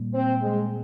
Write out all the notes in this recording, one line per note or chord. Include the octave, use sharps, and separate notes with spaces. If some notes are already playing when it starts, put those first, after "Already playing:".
Already playing: A#2 G3 A#3
C4
G#3